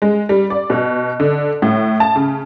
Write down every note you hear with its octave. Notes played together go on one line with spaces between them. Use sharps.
G#3
G3
D5
B2
D3
A2
A5
C#3